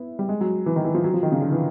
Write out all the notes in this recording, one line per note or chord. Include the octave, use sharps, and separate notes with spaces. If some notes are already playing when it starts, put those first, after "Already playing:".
Already playing: B3 E4
G3
G#3
F#3
E3
D#3
E3
F3
F#3
F3
D#3
C#3
D3
E3